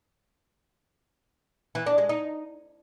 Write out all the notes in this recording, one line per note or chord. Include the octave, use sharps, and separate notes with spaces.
E3
D4
G#3
D#4